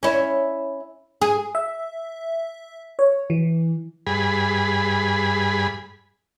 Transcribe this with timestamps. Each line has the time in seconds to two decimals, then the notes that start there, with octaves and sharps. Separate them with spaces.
0.03 C#4 E4
1.22 G#4
1.55 E5
2.99 C#5
3.30 E3
4.07 G2 G#4 B5